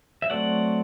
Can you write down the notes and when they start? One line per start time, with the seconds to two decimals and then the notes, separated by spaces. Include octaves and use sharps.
0.22 E5
0.30 F#3 A3 C4 D5 F#5